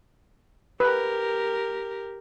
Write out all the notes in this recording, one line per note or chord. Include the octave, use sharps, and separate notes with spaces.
G4 A#4 B4